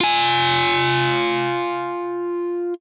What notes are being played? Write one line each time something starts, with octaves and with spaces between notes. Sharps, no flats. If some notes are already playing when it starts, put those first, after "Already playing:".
F4 G#5